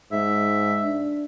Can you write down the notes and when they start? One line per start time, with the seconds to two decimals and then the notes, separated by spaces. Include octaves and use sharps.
0.12 G#2 E5
0.84 D4